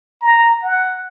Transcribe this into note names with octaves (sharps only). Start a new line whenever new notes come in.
A#5
F#5